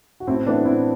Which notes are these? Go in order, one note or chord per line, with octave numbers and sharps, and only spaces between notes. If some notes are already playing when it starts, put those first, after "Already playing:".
F#4
A2 C4 E4
E3 A3 B3 D4
A2 C4 E4